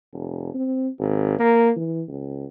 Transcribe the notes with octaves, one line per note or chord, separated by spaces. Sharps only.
F1
C4
G#1
A#3
E3
C#2